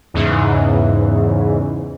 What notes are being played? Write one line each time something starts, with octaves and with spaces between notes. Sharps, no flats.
E2 G#2 C#3 E3